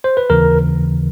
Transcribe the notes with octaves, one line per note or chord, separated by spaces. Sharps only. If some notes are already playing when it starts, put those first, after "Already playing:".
C5
B4
D#2 C#3 E3 A#4